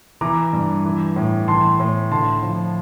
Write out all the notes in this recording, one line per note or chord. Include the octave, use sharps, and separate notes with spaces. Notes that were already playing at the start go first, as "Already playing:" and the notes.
E3 A#5 D6
G2
E3
A2
E3 A5 C6
A2
D3 A5 C6
F3